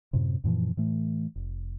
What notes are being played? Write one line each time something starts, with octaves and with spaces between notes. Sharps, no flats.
F#2 A2 C3
F#2 A#2 E3 F3
A2 E3 A3
F1